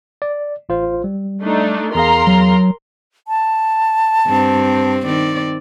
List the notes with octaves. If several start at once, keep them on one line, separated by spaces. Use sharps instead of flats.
D5
A1 F4 C5
G3
A3 D4 D#4
E2 G#4 A#4 F5 A#5 C6
F#3
A5
G2 C4
D#3 C4 D5